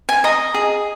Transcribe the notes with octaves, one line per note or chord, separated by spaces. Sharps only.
G#5
D#5 A#5
G#4